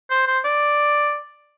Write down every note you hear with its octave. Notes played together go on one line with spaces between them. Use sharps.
C5
C5
D5